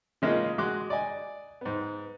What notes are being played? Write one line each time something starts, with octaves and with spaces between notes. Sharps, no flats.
C#3 G#3 A#3 D#4 F4
G#3 F#4 C6 D6 F#6
D5 D#5 G#5
G#2 B3